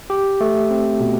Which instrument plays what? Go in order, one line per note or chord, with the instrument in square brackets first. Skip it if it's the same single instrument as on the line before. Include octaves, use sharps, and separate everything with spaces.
[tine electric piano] G4
A3
C4
B2